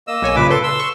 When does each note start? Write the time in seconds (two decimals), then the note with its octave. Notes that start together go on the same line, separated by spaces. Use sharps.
0.08 A#3 D#5 E6
0.22 B1 C#5 G#5
0.36 G2 A#2 C#3 B4 D6
0.50 A4 B4 C6
0.63 C6 E6
0.80 C#6